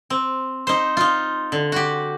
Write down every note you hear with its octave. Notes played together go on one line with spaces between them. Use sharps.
C4
D#4 C5
D#4 F4
D3
F#4 G4